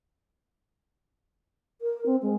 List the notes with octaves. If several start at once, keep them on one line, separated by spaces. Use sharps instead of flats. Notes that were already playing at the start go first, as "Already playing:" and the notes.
A#4
C4
G#3